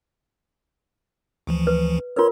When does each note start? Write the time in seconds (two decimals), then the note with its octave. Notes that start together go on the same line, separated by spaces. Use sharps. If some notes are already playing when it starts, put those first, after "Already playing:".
1.47 D2 E3 F3
1.67 B4
2.16 F4 A#4 B4 C#5 C6